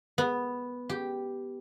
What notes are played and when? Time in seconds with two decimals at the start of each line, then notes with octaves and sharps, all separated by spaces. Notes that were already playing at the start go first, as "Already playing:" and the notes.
0.18 B3
0.89 G4